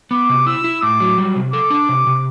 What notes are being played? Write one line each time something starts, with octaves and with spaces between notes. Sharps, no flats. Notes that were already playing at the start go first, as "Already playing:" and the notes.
B3 D6
C3
E4 E6
E4
A2 D6
F#3
G3
C3
A4 D6
D4
C3
C3